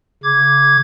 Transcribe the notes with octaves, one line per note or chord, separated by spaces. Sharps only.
C#3 D6 G#6